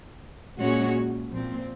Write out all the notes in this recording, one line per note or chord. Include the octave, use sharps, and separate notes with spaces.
A#2 G#3 C#4 F#4 C#5
A#2 F3 C4